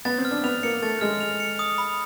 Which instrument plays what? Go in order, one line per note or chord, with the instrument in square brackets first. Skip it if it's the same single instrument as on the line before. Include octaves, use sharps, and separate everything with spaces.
[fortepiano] B3 [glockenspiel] A6
[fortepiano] C4
[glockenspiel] F6
[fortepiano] D4
[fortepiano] B3 [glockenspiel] F7
[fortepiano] A#3 [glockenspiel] C#7
[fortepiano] A3 [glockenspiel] A6
[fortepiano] G#3 [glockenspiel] F6
[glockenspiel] F7
C#7
D#6
B5